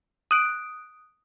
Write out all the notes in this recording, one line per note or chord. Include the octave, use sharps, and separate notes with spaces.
D#6 F#6 D7